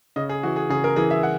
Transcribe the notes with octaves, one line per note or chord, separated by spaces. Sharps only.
C#3 D#5
G#4
E3 F#4
G#4
C#3 G#4
A#4
E3 G#4
E5
F#5